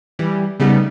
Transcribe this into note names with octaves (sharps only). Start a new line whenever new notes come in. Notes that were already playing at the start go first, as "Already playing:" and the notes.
E3 G3
C#3 G3 A3 B3 D#4